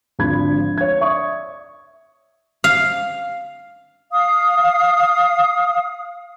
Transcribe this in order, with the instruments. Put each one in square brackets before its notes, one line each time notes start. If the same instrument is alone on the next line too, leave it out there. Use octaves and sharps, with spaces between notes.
[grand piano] G#1 D3 F3 B5 G#6
C#5 G#6
D5 E5 C#6 D#6
[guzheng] F5
[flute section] F5 D#6